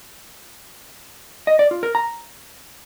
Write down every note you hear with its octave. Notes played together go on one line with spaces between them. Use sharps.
D#5
D5
F4
A#4
A#5